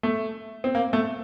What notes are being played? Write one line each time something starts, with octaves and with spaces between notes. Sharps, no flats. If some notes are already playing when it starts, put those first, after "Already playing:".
A3
C4
A#3
A3